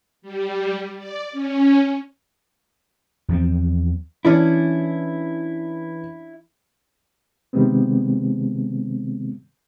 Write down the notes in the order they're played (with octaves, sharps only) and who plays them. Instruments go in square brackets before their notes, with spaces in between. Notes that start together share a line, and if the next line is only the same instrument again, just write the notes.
[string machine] G3
D5
C#4
[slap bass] E2 F3 C4
[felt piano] E3 [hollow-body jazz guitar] C#4 D4 E4
[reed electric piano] C3 D#3 G3 G#3 B3 C4